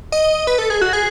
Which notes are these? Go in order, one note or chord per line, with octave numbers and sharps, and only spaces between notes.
D#5
B4
A4
G#4
F#4
G#4